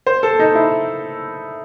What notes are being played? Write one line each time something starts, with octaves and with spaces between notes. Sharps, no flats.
C5
A4
D#4
E4